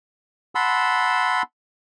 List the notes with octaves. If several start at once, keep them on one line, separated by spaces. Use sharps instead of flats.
F#5 A5 B5 C6 E6